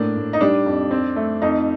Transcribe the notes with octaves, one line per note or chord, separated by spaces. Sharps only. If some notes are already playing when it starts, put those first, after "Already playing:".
Already playing: A2 A#3 D4
A2
D#4
G3 D4
F2
C4
A3
F2 D#4